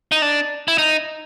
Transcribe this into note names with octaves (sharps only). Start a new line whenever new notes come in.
D#4
D4
E4
D#4